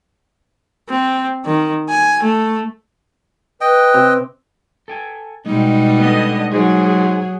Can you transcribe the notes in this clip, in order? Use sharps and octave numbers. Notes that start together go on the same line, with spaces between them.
C4
D#3
G#5
A3
B4 D#5 G5
C3
A4 G5 G#5
B2 G3 G#3 D#4
D3 B3 D#5
G#2 F#3 G#4